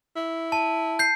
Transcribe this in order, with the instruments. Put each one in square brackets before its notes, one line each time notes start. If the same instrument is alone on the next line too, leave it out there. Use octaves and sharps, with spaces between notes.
[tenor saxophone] E4
[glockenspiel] A5
G6 C7